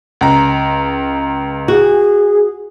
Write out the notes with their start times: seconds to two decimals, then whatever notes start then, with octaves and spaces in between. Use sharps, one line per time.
0.21 C#2 A#5
1.68 F#4 G#4